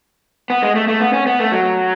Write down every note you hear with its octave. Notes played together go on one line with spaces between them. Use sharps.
B3
G#3
A3
A3
B3
C#4
B3
A3
F#3